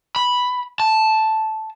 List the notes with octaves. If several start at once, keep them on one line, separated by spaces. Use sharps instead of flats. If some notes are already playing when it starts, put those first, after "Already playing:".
B5
A5